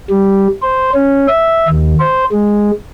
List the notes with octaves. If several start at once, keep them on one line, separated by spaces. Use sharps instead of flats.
G3
C5
C#4
E5
D#2
C5
G#3